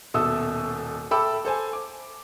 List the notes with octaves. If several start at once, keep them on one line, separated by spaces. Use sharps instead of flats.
D#1 B2 A4 E5 D#6 E6
A4 E5 G5 B5 D6 E6
A4 C5 G#5
D6